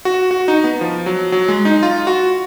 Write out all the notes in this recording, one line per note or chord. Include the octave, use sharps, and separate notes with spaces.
F#4
F#4
D#4
B3
F3
F#3
F#3
G#3
D#4
F4
F#4